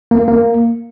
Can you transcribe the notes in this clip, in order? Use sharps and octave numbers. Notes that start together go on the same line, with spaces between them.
A#3
A#3